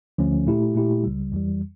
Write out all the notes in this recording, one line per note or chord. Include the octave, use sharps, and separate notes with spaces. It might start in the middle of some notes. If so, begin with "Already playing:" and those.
D2 D3 F3 A3 C#4
A#2 A3 E4 G4
A#2 A3 E4 G4
C#2 C#3 G3
F2 E3 G3